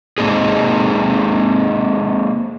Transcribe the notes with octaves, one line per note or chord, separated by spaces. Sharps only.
G#3 A#3 C4 D#4 G#4